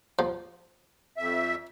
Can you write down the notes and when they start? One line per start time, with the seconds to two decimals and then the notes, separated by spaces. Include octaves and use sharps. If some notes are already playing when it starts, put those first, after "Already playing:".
0.19 F3
1.17 F2 E5